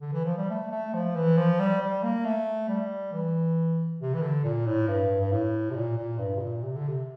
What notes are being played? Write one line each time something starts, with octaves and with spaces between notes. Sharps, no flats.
D3
E3
F3
G3
A3
A3
F3
E3
F3
G3
G3
A#3
A3
G3
E3
C3
E3
D3
A#2
A2
G2
G2
A2
C3
A#2
A#2
G2
C3
A#2
C3
D3
C3